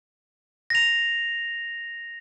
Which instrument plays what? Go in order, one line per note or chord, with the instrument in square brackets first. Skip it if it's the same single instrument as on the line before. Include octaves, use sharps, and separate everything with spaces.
[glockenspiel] A#6 F7